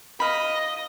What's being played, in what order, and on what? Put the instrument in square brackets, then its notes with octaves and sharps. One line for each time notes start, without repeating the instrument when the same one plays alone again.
[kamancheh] D#5 [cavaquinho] F5 B5